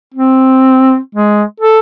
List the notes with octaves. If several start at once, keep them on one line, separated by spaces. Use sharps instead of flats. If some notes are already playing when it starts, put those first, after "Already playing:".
C4
G#3
A4